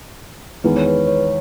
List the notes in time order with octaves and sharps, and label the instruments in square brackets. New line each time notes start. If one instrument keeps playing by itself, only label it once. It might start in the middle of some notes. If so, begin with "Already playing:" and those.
[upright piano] E2 D#3 G#3 [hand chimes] B4
[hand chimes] C#5
B4
C#5